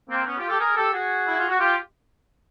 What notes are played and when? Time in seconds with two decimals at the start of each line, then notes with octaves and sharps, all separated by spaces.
0.10 A#3 C4
0.26 B3 C#4
0.38 F4 G4
0.48 G4 A4
0.59 G#4 A#4
0.76 G4 A4
0.93 F#4 G#4
1.27 E4
1.38 F4
1.49 F#4
1.59 F4 G4